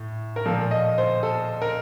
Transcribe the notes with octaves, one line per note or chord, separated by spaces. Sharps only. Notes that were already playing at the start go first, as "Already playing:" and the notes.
Already playing: A2
A#4
A#2 F3 A4
D#5
C5
A4
A#4